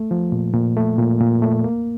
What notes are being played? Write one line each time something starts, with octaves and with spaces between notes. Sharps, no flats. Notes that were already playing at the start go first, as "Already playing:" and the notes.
Already playing: A3
F3
A#2
A#2
A3
A#2
A#2
A3
A#3